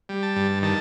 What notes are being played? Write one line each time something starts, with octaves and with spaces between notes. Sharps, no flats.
G3
A5
G2
D#3 A5